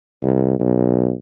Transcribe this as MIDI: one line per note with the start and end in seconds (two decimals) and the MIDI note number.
0.23 0.58 36
0.60 1.12 35